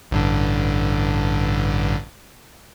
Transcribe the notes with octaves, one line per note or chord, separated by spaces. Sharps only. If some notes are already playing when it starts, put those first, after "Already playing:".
A1 G2 D3